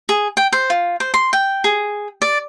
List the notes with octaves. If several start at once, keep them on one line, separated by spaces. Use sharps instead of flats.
G#4
G5
C5
F4
C5
C6
G5
G#4
D5